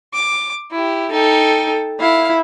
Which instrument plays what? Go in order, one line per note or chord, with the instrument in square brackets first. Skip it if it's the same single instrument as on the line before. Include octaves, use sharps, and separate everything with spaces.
[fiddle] D6
E4 G4
[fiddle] D#4 G5 [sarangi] A4
[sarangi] E4 [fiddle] F5